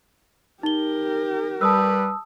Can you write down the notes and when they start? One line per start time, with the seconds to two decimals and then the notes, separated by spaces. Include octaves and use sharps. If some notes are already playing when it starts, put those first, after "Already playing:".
0.63 D#4 G4 A#4 G7
1.61 G3 B4 A5 D#6 E6